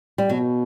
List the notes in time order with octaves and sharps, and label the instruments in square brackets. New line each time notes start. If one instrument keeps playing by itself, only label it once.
[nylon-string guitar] G3
[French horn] B2 [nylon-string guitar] F#3